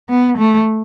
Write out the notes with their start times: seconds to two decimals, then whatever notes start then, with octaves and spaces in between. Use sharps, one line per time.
0.10 B3
0.38 A3